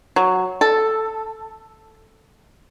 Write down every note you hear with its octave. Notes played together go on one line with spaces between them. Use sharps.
F#3
A4